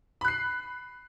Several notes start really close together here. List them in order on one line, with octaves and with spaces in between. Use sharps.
B5 F#6 C7